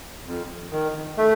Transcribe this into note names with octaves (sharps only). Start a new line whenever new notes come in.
F2
D#3
A3